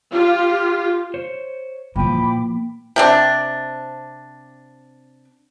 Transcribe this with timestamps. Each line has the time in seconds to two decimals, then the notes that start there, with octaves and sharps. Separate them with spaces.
0.12 F4 G4
1.14 C5 C#5
1.96 A#2 E3 F3 A#3 G5 B5 D6
2.96 C3 C4 D4